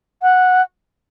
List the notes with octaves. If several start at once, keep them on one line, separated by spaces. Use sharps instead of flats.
F#5